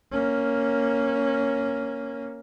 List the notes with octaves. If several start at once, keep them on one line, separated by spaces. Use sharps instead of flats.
A#3 C#4